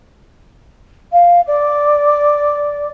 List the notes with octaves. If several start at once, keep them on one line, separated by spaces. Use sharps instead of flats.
F5
D5